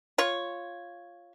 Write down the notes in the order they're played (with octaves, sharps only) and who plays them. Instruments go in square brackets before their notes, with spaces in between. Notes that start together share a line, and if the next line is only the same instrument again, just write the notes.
[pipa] F4 C#5